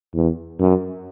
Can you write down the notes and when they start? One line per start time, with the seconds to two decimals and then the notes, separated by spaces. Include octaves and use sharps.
0.15 E2
0.60 F#2